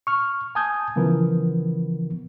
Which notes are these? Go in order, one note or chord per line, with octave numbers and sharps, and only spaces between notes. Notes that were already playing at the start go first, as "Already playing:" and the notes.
C#6 F6
G#5 A5 D#6 G6 G#6
C#3 E3 F3 B3 A#4